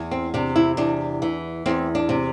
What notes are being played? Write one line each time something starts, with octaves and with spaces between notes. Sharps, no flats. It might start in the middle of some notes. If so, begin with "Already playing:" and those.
Already playing: E2
C4
C3 D4
E4
E2 D4
E3
E2 C4
D4
C3